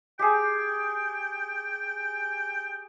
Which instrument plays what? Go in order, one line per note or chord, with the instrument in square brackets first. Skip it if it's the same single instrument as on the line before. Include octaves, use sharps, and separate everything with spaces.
[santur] G4 G#4 [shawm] G5